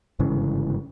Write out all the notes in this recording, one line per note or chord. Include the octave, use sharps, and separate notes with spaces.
G1 G#2 C#3 E3